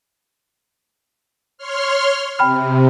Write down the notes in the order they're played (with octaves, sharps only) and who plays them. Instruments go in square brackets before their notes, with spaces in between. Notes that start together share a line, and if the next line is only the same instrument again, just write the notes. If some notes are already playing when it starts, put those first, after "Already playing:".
[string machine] C#5 C6 F6
[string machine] C3 [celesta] G5 B5 F6